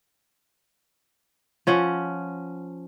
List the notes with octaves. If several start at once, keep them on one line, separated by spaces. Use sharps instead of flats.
F3 C#4 F#5